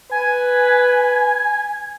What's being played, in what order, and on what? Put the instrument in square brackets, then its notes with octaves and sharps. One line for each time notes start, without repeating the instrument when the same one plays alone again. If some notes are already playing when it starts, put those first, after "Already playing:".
[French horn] B4 [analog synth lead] G#5